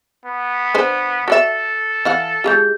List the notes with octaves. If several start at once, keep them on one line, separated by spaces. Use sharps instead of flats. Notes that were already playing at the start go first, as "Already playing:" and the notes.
B3
D3 B4 C5
F#4 A4 D5 E5
E3 F5 F#5
G#3 E4 F4 G4 G#4 G6